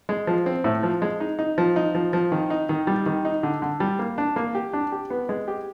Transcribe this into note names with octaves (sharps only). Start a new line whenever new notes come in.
G#3
F3
C4
A2
F3
G#3
D#4
D#4
F3
D#4
F3
F3
D#3
D#4
D#3
G3
D#3
D#4
D3
D3
G3
A#3
D4
A#3
G4
D4
G4
B3
G#3
G4